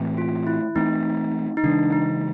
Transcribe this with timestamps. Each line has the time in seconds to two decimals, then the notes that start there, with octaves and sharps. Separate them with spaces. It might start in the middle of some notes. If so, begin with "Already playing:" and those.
Already playing: A2 E3 A3 C4
0.18 F4
0.47 E4
0.76 E3 A3 C4 D#4
1.57 D#4
1.63 C#3 E3 G#3 D4
1.92 D#4